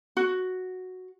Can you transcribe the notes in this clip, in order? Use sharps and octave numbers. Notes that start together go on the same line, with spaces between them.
F#4